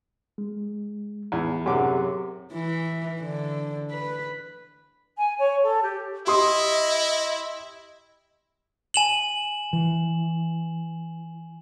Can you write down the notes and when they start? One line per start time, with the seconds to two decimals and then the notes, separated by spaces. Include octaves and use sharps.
0.38 G#3
1.32 E2
1.66 F#2 C3 G#4 C#5 F#5 D6
2.53 E3
3.21 D3
3.91 B4
5.18 G#5
5.38 C#5
5.64 A4
5.83 G4
6.27 E4 G4 D#5 C6 D#6
8.94 G#5 E7 F#7
9.73 E3